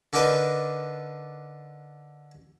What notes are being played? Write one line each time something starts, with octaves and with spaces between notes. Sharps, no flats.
D3 D4 D#4 A#4 B4